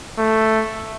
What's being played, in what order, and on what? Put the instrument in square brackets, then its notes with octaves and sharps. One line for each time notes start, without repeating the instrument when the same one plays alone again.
[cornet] A3